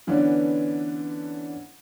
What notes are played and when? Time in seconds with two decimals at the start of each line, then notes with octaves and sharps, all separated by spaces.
0.07 D3 E3 B3 C#4 D4